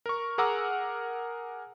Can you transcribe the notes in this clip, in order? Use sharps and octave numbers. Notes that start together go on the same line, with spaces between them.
A#4 C#6
G#4 A#4 F#5 A#5 D6 E6